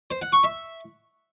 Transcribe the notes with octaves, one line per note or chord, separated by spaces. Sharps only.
C5
F#5
C#6
E5